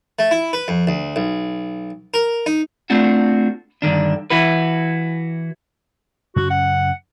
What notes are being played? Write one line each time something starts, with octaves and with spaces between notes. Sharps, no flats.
A3
E4
B4
F2
D2
B1
A#4
D#4
A3 C4 D4 F4 F#4
G2 D3 D#3 D4
E3 E4 F#4 B4
F#2 C#3 C#4 F#4
F#5